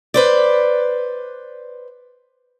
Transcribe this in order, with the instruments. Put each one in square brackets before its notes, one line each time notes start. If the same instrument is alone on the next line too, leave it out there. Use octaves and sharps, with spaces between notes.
[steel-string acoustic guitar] B4 C5 D5